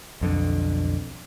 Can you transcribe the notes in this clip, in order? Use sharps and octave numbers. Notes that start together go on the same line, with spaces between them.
B1 F2 D3